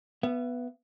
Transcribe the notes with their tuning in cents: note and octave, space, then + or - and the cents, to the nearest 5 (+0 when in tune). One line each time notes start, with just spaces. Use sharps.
B3 +0 E5 +40